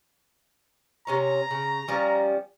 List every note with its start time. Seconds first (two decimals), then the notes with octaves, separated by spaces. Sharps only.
1.07 C3 C#4 C#5 A#5
1.51 C#3
1.88 F3 G3 C#4